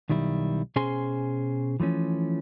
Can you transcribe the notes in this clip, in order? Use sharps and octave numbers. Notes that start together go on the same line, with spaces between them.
B1 D#3 G3 E4
B2 C#4 G#4 C5 G#5 C6
E3 F3 A3 C#4